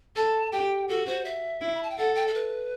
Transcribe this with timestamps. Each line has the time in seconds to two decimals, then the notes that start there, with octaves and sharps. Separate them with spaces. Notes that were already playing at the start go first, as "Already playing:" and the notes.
0.16 A4 A5
0.52 G4 G5
0.89 F#4 A4
1.07 C5
1.25 E5
1.61 E4
1.75 B5
1.83 A5
1.90 G5
1.98 A4 F#5
2.15 G5
2.27 A4
2.34 B4